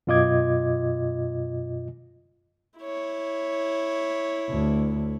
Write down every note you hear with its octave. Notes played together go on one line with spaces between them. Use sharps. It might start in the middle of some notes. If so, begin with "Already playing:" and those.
F#2 B2 F4 D#5 D6 G#6
E4 C#5
D2